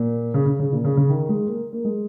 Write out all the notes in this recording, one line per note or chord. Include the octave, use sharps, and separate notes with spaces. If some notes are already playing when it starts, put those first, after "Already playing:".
Already playing: A#2
C#3
C#3
C#3
A#2
C#3
C#3
D#3
G#3
A#3
A#3
G#3